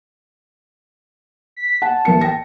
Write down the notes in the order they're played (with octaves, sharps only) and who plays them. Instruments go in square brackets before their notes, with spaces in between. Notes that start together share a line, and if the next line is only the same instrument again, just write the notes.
[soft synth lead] B6
[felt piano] F#5 [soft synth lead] A5
[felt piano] A1 A#4 C#7
G5 A#6